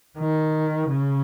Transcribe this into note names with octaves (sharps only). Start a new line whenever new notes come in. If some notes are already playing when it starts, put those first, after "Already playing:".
D#3
C#3